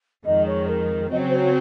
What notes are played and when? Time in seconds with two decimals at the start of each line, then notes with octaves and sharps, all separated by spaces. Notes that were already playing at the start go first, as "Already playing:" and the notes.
0.24 F2 D#3 G#3 D#5
0.46 C#5
0.68 A#4
1.11 C#3 F#3 C4 D#5
1.19 C#5
1.28 C5
1.37 C#5